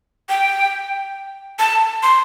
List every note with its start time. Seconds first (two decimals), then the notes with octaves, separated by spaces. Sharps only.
0.29 G5
1.59 A5
2.03 C6